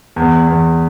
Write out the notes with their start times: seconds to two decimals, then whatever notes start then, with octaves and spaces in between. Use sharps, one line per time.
0.16 E2
0.47 E2